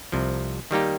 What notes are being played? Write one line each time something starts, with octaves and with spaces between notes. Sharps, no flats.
C2 C3 F3
D#3 G3 A#3 D#4 G4